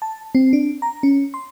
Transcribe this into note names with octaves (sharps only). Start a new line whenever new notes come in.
A5
C4
D4
A#5
C#4
C6